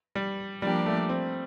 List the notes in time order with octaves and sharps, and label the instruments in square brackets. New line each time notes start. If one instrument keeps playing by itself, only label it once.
[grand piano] G3
[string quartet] F3 A#3 D4 G4 D5 [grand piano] G3
[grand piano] A3
C4